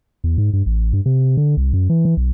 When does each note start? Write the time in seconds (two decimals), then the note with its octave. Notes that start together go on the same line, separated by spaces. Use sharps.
0.24 E2
0.38 G#2
0.53 G2
0.66 A1
0.93 G2
1.06 C3
1.37 D3
1.57 C2
1.73 F#2
1.90 E3
2.05 E3
2.17 B1